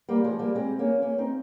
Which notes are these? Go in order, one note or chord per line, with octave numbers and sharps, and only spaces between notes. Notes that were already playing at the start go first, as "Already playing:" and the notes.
G3 A#3
F3 G#3
G3 A#3
G#3 C4
A#3 C#4
A#3 C#4
C4 D#4